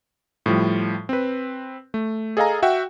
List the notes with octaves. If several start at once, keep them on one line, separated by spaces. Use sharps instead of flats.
A2 F3 G3
C4 B4
A3
G#4 A4 D#5 F5 G#5 A#5
F#4 E5 F#5 G5